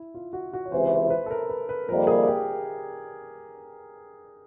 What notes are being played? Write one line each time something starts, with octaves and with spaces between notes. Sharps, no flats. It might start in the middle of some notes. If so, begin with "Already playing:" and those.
Already playing: E4
F4
F#4
F#4
C#5
C#2 C3 E3 C5
C5
C5
B4
A4
A#4
B4
B4
F2 C3 D#3 G3 A#3 A#4
G#4
G4